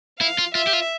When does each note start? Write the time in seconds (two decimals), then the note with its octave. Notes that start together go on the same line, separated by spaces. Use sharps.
0.20 E4 F5
0.38 F4
0.55 F4 E5
0.67 G4
0.73 F4